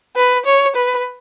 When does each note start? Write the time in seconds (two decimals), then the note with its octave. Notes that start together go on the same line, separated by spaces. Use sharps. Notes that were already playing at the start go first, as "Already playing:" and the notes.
0.16 B4
0.45 C#5
0.76 B4